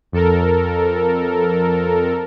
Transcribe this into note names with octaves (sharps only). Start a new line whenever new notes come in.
F2 A4 A#4